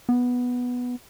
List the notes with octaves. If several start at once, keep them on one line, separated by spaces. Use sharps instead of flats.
B3